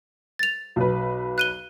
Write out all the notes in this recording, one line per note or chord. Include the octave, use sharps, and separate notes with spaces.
A6 F7
B1 B4
F#6 D#7 G7